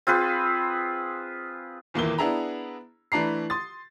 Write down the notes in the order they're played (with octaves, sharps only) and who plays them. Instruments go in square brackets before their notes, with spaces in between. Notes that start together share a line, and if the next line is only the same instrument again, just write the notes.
[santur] C4 F4 G#4 B4
[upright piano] D#1 E2 A#3 E4 G7
B3 D4 E4 G#4 A#5 B5
E3 A3 D4 A#5 C7
C6 D#6 A6